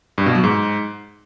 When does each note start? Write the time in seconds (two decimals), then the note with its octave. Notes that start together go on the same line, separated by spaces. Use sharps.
0.18 G2
0.26 B2
0.35 F#3
0.44 G#2